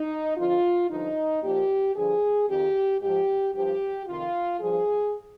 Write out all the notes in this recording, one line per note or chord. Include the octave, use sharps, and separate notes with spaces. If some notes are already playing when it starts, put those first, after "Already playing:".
Already playing: D#4
F2 D3 F3 F4
G2 D3 F3 D#4
A#2 F3 G4
G2 D3 F3 G#4
F2 D#3 G4
G#2 F3 G4
G2 F3 G4
F2 C3 D#3 F4
G2 F3 G#4